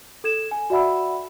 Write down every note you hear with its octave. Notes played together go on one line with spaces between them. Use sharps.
A4 G#6 E7
G#5
F#4 D5 E5 F#5 B5 E6